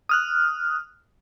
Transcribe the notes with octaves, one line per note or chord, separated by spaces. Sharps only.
D#6 F6 F#6